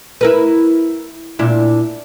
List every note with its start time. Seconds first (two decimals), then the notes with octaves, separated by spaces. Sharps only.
0.21 E4 A#4 B4
1.39 A#2 D4 E4